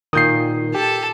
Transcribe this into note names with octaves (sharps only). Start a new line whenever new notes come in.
A#2 D#3 D#6 G6 C7
G4 A4 A5